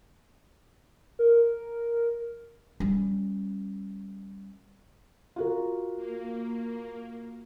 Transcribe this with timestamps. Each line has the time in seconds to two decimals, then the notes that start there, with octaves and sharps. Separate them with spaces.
1.19 A#4
2.80 G3 C#4
5.36 F4 F#4 A#4
5.96 A#3